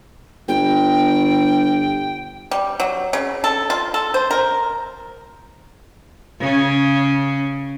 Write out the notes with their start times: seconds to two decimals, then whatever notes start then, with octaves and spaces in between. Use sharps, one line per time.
0.48 G1 G5
2.51 G3
2.80 F#3
3.13 C#3
3.44 A4
3.70 F4
3.94 A4
4.14 C5
4.31 A#4
6.39 C#3 C#4